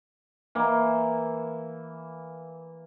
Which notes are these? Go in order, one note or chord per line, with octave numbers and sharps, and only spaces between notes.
E3 A#3